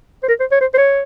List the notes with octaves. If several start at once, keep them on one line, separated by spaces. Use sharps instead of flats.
C5
A#4
C5
C#5
C5
C5
C#5